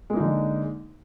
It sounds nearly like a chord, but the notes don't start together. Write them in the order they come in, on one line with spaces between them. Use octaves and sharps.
G#3 A#3 D#4 D3